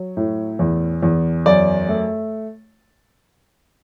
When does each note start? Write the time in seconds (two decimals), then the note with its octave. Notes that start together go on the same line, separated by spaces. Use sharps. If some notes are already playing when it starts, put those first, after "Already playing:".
Already playing: F#3
0.17 A2
0.59 E2
1.03 E2
1.46 F#2 D5
1.89 A3